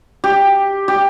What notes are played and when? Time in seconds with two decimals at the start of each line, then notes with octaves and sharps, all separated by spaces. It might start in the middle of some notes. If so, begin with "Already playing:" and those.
0.24 G4
0.88 G4